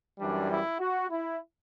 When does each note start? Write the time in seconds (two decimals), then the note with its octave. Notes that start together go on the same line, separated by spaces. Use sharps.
0.19 F#2 E3 G3 D4
0.50 E4
0.80 F#4
1.10 E4